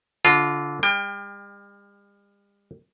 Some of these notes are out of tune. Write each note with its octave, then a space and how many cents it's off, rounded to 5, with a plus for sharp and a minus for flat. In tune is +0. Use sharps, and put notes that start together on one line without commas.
D3 -20 F4 +0 D#5 +0
G3 +45 G5 +25